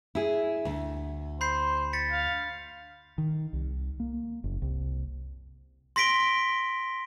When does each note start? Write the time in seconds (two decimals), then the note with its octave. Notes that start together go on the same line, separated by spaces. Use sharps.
0.15 E4 G#4
0.65 D2
1.41 C5 B5 G6 C7
1.93 A6 B6 C#7
2.10 F5
3.18 D#3
3.53 C2
4.00 A#3
4.44 F#1
4.62 C2
5.96 C6 A#6 B6 D7 G7